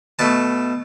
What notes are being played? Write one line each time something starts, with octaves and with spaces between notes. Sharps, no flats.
B2 A3 A5